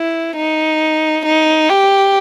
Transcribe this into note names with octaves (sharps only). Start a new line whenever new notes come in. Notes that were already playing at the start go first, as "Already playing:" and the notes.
Already playing: E4
D#4
D#4
G4